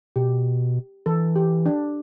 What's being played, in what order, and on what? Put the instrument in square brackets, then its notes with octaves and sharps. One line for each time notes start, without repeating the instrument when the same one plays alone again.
[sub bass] B2 [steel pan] G4
[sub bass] E3 [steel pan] A4
[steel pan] G4
D4